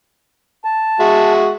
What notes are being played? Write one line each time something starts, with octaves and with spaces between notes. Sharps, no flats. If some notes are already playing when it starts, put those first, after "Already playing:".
A5
G#3 F#4 E5